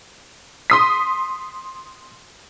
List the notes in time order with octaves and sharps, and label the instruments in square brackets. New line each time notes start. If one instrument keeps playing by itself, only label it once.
[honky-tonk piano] C6 D#6 B6